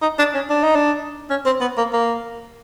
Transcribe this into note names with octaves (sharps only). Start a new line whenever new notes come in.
D#4
D4
C#4
D4
D#4
D4
C#4
C4
B3
A#3
A#3